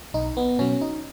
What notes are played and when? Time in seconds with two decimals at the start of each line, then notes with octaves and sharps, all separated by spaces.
0.14 B1 D#4
0.37 B3
0.59 B2 F#3 C#4
0.81 D#4